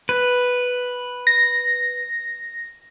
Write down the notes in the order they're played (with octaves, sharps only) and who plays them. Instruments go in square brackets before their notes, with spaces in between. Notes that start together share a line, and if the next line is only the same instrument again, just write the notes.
[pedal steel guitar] B4
[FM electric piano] A#6